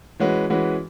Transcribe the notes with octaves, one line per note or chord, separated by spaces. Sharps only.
E3 G#3 C#4 F#4 B4
E3 G#3 C#4 F#4 B4